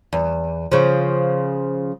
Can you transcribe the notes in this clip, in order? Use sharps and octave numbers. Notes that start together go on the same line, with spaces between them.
E2
C#3 F3